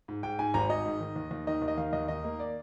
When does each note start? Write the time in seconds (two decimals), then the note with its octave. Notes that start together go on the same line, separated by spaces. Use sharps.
0.08 G#2
0.23 G#2 G5
0.39 G#2 G#5
0.54 G#1 A#5
0.70 G#1 D#5
0.85 G#2
1.00 D#3
1.16 D#2
1.31 D#2
1.47 D#3 D#5
1.62 D#2
1.68 D#5
1.77 D#3 F5
1.93 D#2 D#5
2.08 D#3 D#5
2.24 A#3
2.39 D5